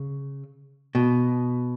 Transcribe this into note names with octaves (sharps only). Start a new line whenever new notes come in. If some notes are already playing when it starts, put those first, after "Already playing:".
Already playing: C#3
B2